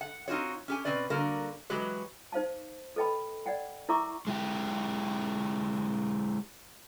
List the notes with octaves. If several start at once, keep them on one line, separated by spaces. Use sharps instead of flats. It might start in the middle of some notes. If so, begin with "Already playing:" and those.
F#5
C4 D#4 F4 F#4 C#5
C#4 G4 G#5
B2 E3 C4 C#4 B4 D5
G2 D3 A#3 F#4 A#4
E3 F#3 G#3 F#4 G4 B4
D#4 C5 F5 A5
A4 B4 D#5 G5 A5 B5
D5 D#5 F#5 G5
E4 A#4 E5 A#5 C#6 D6
G#3 E4 G4